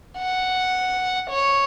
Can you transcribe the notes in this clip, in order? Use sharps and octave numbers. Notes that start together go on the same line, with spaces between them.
F#5
C#5